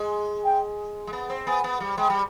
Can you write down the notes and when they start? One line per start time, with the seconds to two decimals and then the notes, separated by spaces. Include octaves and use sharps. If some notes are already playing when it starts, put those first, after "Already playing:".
Already playing: G#3
0.44 G5
1.07 G#3
1.13 B3
1.30 C4
1.47 B3 G#5
1.64 B3
1.80 G3
1.98 G#3 G5
2.10 G3